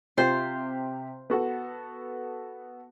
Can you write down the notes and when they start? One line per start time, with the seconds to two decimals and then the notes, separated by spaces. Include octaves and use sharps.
0.17 C3 F4 G4 C5
1.30 B3 F#4 A4